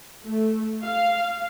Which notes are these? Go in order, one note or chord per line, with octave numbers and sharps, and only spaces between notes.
A3
F5